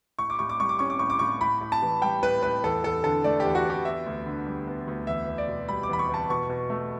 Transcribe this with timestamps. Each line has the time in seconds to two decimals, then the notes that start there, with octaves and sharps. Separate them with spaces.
0.19 A2 C#6
0.30 D6
0.39 A2 C#6
0.49 D6
0.60 G3 C#6
0.69 D6
0.79 C#4 C#6
0.90 D6
0.99 A2 C#6
1.10 D6
1.19 A2 C#6
1.41 A2 B5
1.61 A2
1.72 A5
1.82 E3
2.02 G3 G5
2.23 A2 B4
2.43 A2 B4
2.64 E2 A4
2.84 E2 A4
3.04 D3 A4
3.24 A3 D5
3.40 G4
3.45 E2
3.55 F#4
3.65 E2 G4
3.85 B3 E5
4.06 D2
4.26 D3
4.47 G3
4.67 B3
4.88 D2
5.07 E2 E5
5.27 E2
5.38 D5
5.48 B2
5.69 G3 B5
5.83 D6
5.89 E2 B5
5.99 C#6
6.09 E2 A5
6.29 B2 C#6
6.49 B2
6.70 A3